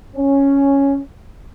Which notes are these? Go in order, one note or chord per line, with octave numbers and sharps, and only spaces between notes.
C#4